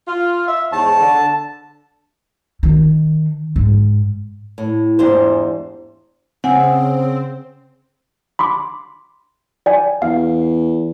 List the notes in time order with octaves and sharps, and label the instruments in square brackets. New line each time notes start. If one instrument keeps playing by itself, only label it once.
[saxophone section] F4
E5
[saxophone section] E2 G#2 C#5 [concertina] A5
[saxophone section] D3
[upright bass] D#3
G#2
[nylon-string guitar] A2
E2 G#2 D4 F4 G4 C5
[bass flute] C#3 [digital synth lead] C4 [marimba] F#5 G#5
[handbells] B5 C6 D6
D5 G5 G#5
[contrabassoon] E2 [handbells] F5